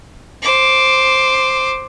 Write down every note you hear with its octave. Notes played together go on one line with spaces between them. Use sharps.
C5 D6